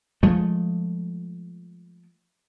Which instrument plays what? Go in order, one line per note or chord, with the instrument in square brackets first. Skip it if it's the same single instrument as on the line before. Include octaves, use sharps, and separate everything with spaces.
[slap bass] F3 G#3 A3